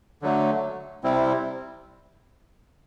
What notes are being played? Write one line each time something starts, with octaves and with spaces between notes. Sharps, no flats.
D3 F#3 A3
C3 G3 C4 E4